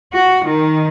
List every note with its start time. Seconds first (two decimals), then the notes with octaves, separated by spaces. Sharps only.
0.15 F#4
0.48 D#3